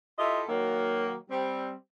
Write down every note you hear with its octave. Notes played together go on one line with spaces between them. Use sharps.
E4 F4 G4 A4 D#5 E5
D#3 F#3 A#3
G3 C4